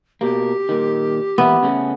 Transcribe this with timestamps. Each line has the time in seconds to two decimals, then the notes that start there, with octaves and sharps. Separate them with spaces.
0.21 B2 A#3 G4
0.69 A#2 D#3
1.38 A#2 E3 B3 E5
1.63 C#3 A3 C#4